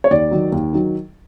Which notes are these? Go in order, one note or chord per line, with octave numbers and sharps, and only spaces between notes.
C#5
D#2 D5
D#3 F#3
D#2
D#3 F#3